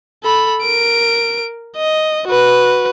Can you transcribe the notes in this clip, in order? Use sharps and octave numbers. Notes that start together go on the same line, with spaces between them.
A4 B5
A#4 D7
D#5
F#4 B4